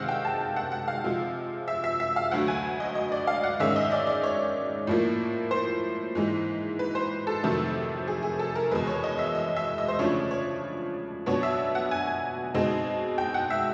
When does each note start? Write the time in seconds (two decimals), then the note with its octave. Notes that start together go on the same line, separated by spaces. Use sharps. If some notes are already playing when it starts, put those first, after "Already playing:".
Already playing: C3 D#3 G#3 C4 F5 F#5
0.09 G5
0.25 A5
0.56 F#5
0.72 F#5
0.88 F5
1.04 C3 F3 G#3
1.68 E5
1.84 E5
2.00 E5
2.16 F5
2.31 D2 D3 F#3 A3 F#5
2.48 G#5
2.80 D#5
2.95 D#5
3.12 D5
3.27 F5
3.44 F#5
3.59 G#2 D#3 G#3 C#4 E5
3.76 D#5
3.92 D5
4.07 D5
4.23 C#5
4.87 A2 F3 A#3
5.51 C5
6.15 G#2 E3 G#3
6.79 B4
6.95 C5
7.27 A4
7.43 F2 C3 D#3 F#3 A3
8.08 G#4
8.23 G#4
8.39 A4
8.55 A#4
8.71 E2 B2 G#3 B4
8.87 C#5
9.04 D#5
9.19 E5
9.35 D#5
9.57 E5
9.78 D#5
9.88 C5
9.99 C#3 F3 A3 D4 C#5
10.31 C#5
11.26 B2 F#3 B3 D4 C#5
11.43 E5
11.75 F#5
11.91 G#5
12.54 B2 G#3 C4 D#4
13.18 G5
13.34 F#5
13.50 E5